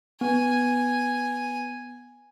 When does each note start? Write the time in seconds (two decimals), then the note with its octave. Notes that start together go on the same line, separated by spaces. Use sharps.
0.21 B3 G#5